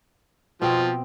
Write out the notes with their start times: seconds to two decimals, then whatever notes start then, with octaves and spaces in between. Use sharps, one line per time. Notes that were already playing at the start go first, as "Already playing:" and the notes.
0.62 B2 F3 C4 D#5